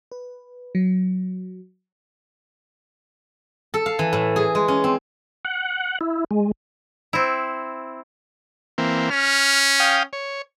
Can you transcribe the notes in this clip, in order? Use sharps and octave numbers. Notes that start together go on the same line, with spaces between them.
B4
F#3
A4
F5
E3
A2
G#4
G#3
C#4
C4
F#5
E4
G#3
C4 E4
E3 A#3 C4
C#4 F6
F5 G5 D#6
C#5